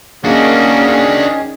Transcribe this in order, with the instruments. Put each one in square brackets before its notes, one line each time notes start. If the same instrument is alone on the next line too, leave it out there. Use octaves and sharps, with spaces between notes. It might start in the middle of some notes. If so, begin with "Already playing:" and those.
[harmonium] D#3 G#4 [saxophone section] A#3 [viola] C#4 [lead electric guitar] D4 F#4